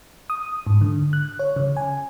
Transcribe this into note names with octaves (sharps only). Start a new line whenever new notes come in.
D#6
G#2
D3
F#6
C#5
C#3
G#5